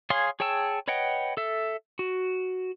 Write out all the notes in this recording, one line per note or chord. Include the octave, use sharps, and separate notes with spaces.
G#4 C#5 F5 G#5 C6
G#4 C#5 G5 A5 E6
B4 C#5 D#5 F#5 G5
A4 E5
F#4